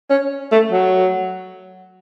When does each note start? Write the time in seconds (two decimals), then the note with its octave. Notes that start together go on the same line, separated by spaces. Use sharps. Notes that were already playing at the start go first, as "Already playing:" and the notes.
0.10 C#4
0.51 A3
0.72 F#3